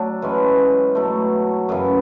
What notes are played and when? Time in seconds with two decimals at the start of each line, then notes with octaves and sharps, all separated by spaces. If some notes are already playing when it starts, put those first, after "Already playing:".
Already playing: F#3 A3 D4
0.22 E3 G#3 C#4
0.95 B2 F#3 A3
1.69 F#2 C#3 E3